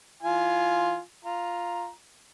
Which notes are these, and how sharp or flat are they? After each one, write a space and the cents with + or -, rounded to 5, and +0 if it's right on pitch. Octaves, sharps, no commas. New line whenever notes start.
E3 +0 F4 +0 G#5 +20
F4 +0 A#5 +5